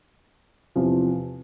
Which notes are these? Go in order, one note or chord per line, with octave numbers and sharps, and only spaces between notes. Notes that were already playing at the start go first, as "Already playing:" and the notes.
E2 C3 F3